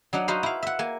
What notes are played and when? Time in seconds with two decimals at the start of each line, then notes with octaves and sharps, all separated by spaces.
0.13 F#3 D4 D#4 F#5
0.28 D#4 F#4 B4 C5 F5
0.43 E4 F5
0.63 E5 F#5
0.79 A#3 G#5